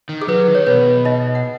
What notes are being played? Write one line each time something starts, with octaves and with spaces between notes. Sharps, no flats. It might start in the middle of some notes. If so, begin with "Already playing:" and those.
D#3
G#4
F#3 B4
D#3
C#5
B2 B4
D#4 D#5
F#5